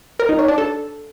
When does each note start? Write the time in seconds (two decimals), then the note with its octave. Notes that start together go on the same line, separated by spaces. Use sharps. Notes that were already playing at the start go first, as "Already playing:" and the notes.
0.19 A#4
0.29 D#4
0.39 C#5
0.48 D4
0.58 A4